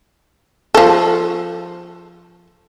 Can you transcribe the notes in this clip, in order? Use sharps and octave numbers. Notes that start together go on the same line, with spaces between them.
F3 A4